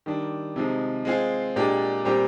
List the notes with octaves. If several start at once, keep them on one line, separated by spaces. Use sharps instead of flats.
D#3 G3 D4
C3 F3 G#3 D#4
G#3 C4 F4 G#4
A#2 G#3 D4 G4
A#2 G3 C4 G4